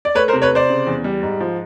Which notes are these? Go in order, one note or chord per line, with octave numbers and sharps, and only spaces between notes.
D5
A3 B4 C#5
A#4 C5
C3
B4 C#5
C3 C5 D5
C#3
E2
G3
G#2
F3